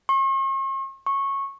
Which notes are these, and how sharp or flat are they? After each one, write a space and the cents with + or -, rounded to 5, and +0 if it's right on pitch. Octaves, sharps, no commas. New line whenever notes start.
C#6 -45
C#6 -15